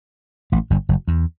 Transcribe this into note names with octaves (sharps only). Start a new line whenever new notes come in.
A1 A2
G1 G2
F#1 F#2
E2